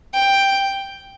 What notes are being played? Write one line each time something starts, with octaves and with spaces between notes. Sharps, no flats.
G5